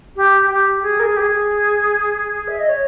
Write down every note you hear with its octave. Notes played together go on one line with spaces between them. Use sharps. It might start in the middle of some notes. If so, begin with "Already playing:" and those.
G4
G4
G#4
A#4
G#4
G4
G#4
E5
D#5
C#5